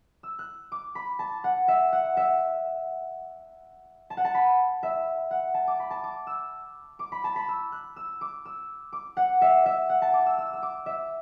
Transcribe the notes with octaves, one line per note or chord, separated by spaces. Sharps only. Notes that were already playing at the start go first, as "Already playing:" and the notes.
E6
F#6
D6
B5
A5
F#5
E5
F#5
E5
A5
F#5
A5
B5
E5
F#5
A5
D6
B5
A5
D6
E6
D6
B5
A5
B5
E6
F#6
E6
D6
E6
D6
F#5
E5
E5
F#5
A5
D6
E6
E6
E6
D6
E5